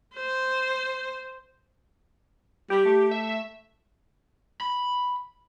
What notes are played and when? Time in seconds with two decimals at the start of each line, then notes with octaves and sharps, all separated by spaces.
0.14 C5
2.70 G3 G4
2.85 A3
3.11 E5
3.29 E5
4.61 B5